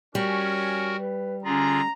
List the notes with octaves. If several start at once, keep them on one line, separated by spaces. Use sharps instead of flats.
G3 C#4 F#4 A#4
B4
D3 C#4 F4 G#4 A#5